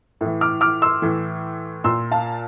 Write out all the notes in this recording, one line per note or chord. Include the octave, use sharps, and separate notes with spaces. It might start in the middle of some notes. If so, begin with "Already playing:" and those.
A2 E3
D6 F6
D6 F6
C6 E6
A2 E3
A#2 C6 E6
F5 A5